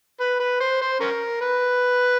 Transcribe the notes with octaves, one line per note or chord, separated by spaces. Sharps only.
B4
B4
C5
C5
C#4 A#4
B4